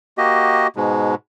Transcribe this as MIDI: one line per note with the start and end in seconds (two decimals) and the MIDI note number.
0.18 0.67 58
0.18 0.67 66
0.18 0.67 67
0.18 0.67 75
0.76 1.15 44
0.76 1.15 47
0.76 1.15 56